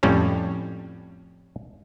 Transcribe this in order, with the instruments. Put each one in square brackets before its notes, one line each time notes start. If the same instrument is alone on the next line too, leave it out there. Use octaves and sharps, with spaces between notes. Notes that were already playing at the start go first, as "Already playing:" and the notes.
[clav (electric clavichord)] F2 A2 G3 C#4 C#5